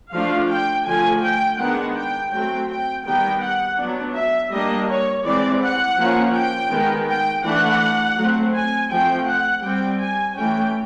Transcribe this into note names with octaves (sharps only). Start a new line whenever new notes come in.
F3 A3 D4 F5
G5
D3 F3 A3 G#5
G5
D#3 G#3 B3 D4 F#5
G5
F#3 A3 C4 G5
G5
D#3 G3 B3 G5
F#5
F#3 B3 D4
E5
G3 A#3 D4 D#5
C#5
E3 G#3 C4 D5
F#5
F3 A#3 C#4
G5
D#3 G#3 B3
G5
E3 A3 D4 F#5
F#3 A3 C4
G#5
F3 A3 C4 G5
F#5
G3 C4 G5
G#5
E3 A3 C#4 G5